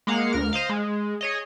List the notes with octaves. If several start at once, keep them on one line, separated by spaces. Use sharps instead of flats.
G#3 A#3 F5 F#5
D2 A#4 F6
C5 D#5 F5
G#3
G#4 C#5 D#5